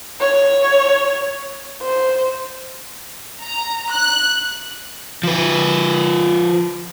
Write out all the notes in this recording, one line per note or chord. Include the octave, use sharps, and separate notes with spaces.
C#5
C5
A#5
F#6
F3 B4